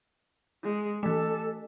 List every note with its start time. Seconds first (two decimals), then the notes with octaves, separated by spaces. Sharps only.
0.64 G#3
1.03 E3 A3 A4